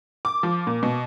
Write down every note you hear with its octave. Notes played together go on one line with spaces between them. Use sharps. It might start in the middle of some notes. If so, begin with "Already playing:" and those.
D6
F3
A#2
B2